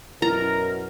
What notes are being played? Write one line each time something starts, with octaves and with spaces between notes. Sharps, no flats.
F#2 B2 E4 A#4 A#5